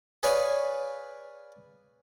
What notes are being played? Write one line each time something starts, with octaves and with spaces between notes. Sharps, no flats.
G#4 B4 C#5 D5 F5 G#5